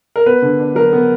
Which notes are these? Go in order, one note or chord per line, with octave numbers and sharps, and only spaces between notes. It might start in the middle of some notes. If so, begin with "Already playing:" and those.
A#4
B3 B4
D3
D4
F#3 A#4
B3